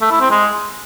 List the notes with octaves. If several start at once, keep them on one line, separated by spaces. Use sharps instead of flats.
A3
E4
C4
G#3